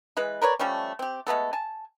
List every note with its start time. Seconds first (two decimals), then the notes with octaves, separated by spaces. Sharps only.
0.17 E3 G#3 B4
0.42 A#4 B4 C#5 D5
0.59 F3 G3 A3 C#4
0.99 C4 G4
1.27 G#3 A3 B3 A4
1.53 G#5 A5